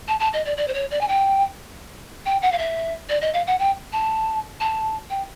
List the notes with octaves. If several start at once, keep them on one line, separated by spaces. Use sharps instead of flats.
A5
A5
D#5
D5
D5
C5
C#5
D5
G#5
G5
G5
F#5
F5
E5
D5
D#5
F5
F#5
G5
A5
A5
G5